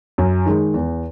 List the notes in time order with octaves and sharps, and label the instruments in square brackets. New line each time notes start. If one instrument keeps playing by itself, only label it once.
[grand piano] F#2
D#3 G#3
E2